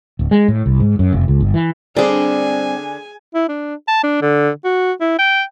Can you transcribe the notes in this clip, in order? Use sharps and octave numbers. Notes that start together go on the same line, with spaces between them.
D1
G#3
A2
C2
G#2
F#2
F1
C#2
G1
E3
D3 G3 C4 D4 G#4 D5 G#5
E4
D4
A5
D4
D3
F#4
E4
G5